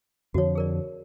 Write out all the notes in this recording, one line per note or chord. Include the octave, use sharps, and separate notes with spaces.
F2 D3 F3 F#4 C#5
G#4 A#4 D5